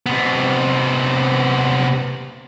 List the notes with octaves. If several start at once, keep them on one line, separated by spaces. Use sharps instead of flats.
C3 B3